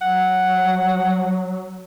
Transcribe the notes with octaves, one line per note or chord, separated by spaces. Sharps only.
F#3 F#5